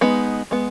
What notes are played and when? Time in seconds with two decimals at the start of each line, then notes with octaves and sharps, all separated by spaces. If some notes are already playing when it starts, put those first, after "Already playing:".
0.01 G#3 B3 D#4
0.51 G#3 B3